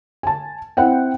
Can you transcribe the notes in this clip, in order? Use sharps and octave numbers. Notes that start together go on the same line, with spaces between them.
G#5 A5
C4 E4 C5 F#5 G5